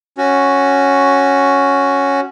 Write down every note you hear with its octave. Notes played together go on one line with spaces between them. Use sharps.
C#4 F#4